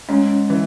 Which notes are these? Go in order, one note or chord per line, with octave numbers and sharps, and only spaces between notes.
G#2 C#4
E3